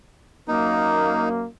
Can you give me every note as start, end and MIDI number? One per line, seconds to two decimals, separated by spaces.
0.48 1.45 42
0.48 1.45 58
0.48 1.29 63